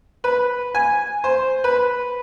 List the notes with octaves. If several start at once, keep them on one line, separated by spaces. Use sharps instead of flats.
B4
G#5
C5
B4